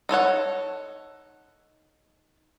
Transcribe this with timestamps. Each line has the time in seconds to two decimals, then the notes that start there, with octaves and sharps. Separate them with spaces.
0.09 D#4 A4 C#5 F#5